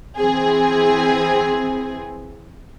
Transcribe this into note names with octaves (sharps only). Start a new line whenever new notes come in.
E3 C4 G#4